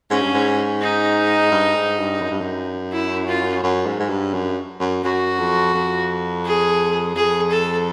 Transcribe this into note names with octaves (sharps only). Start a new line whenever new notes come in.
G#2 C#4
G2
G#2
D#4
G2
G#2
G2
F#2
G2
F#2
E4
F4
F#2
G#2
G#2
G2
F#2
F#2
F#2 F#4
F2
F2
G#4
F2 G#4
A4